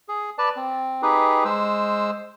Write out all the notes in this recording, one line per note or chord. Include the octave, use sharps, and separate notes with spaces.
G#4
B4 D5 A5
C4
D#4 G4 G#4 B4
G#3 C5 E6